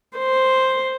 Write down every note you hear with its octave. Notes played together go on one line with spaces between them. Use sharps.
C5